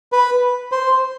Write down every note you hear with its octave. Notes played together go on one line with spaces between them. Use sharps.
B4
C5